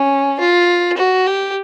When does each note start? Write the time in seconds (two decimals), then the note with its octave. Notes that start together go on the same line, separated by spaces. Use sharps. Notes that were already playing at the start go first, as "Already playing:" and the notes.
Already playing: C#4
0.39 F4
0.97 F#4
1.26 G4